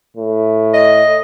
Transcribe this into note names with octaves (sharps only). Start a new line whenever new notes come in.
A2
D#5